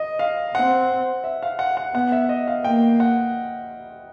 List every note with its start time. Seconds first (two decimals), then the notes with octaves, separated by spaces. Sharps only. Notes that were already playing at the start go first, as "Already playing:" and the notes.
Already playing: D#5
0.19 F5
0.55 C4 F#5
1.24 E5
1.43 F5
1.59 F#5
1.77 F#5
1.94 B3 F#5
2.12 E5
2.29 D#5
2.47 F5
2.64 A#3 G5
3.00 F#5